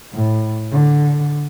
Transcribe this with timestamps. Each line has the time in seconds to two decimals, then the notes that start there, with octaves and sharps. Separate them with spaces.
0.13 A2
0.71 D3